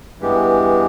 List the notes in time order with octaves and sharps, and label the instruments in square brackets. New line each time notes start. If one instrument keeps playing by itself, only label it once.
[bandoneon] G2 E3 G#3 B3 G4